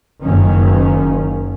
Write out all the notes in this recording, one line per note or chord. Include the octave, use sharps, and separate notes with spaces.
F#1 D#3 C#4